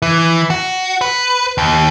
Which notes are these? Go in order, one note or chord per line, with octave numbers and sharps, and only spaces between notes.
E3
F#4
B4
D#2